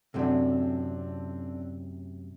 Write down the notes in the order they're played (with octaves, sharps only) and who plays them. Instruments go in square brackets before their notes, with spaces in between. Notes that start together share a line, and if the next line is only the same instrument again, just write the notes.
[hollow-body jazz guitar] F#2 A2 C3 [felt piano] A3 C4 D4